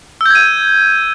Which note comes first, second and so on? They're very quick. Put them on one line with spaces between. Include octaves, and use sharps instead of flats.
E6 G6 G#6 D#7